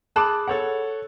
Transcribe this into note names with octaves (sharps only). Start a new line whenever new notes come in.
G#4 A5 B5 D6 F#6
A4 C#5 F#5